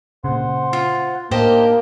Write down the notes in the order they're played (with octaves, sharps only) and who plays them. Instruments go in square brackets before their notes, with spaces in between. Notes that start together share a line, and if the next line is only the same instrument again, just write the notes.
[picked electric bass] A#2 C#3 [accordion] C5 F#5 C6
[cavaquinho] F4
[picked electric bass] A2 [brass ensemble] A#3 [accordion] D4 D#4 A#4 [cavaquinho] G4 C5 D#5